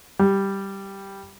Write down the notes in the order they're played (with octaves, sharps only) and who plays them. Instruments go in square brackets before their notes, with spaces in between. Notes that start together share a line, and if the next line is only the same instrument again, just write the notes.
[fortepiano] G3